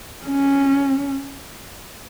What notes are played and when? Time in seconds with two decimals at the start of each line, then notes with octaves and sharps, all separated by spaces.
0.26 C#4